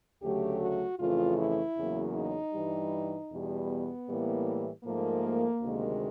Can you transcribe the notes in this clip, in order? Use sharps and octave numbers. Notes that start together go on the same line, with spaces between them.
D2 C#3 F#3 A3 G4
F#4
F2 C#3 E3 A3 F4
E4
E2 C#3 F#3 A#3
D#4
G2 E3 G3
E2 B2 G3
B3
A2 E3 G3 A#3
G#2 F3 A3 A#3
D2 C3 D#3 G#3